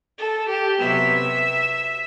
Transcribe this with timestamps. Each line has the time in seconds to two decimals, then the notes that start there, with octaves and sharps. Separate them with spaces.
0.17 A4
0.47 G4
0.78 C3 F#3 B3 E5